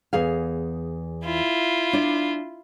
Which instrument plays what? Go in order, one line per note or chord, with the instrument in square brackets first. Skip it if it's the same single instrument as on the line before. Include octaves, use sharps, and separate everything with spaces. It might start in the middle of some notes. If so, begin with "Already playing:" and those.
[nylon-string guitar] E2 G#4 F5
[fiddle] E4 F4
[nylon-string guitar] D4 D5